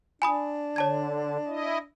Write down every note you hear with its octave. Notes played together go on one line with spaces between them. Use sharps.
D4 G#5 B5 D#6
D3 C#5 A5 G#6
E4 D#5